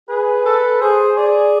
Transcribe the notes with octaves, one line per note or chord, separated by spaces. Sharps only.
G#4 B4
A4
G#4 C5
G#4 D5